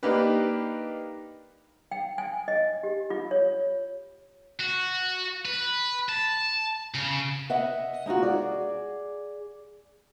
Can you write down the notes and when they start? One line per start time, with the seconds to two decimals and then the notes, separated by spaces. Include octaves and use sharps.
0.03 A#3 D4 D#4 G4 B4
1.91 G5
2.18 G#5
2.48 D#5
2.83 G4
3.10 F4
3.31 C#5
4.61 F#4
5.45 B4
6.09 A5
6.95 C#3
7.50 D#5 E5 F#5
8.06 G#3 D#4 F4 F#4
8.23 G#4 D5